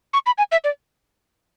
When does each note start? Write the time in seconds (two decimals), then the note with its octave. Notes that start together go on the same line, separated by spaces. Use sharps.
0.13 C#6
0.26 B5
0.38 G#5
0.52 E5
0.64 D5